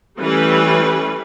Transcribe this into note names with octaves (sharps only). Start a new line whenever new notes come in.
E3 G3 A3 C#4 G4 B4